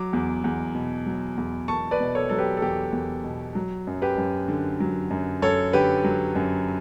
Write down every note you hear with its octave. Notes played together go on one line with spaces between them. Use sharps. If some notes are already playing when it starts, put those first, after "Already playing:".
Already playing: F#3 D6
E2
E2
B2
F#3
E2
E2 A5 C#6
B4 D5
B2
A4 C#5
F#3 A4
G4 B4
A4
E2 G4
E2
B2
F#3
F#2
G4 B4
F#2
D3
F#3
F#2
F#2 A4 C#5
D3 G4 B4
F#3
F#2